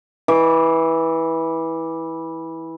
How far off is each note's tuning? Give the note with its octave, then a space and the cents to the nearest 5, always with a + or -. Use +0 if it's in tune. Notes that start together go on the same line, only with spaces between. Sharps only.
E3 -15 D6 +0